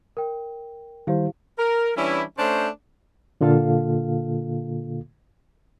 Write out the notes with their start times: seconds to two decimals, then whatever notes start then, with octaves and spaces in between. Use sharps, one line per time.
0.17 A#4 G5
1.07 D#3 G3 E4 G4 C5 F5
1.58 A#4
1.96 E3 G3 C#4 D4 E4
2.38 A3 C#4 D4 C5
3.41 A#2 D3 A#3 F4 A4 F5